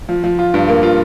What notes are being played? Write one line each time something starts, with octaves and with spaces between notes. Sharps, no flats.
F3
F3
F4
G2
A#3
F4